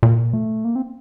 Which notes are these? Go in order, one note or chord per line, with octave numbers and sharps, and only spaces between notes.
A#2
A3
A#3
C4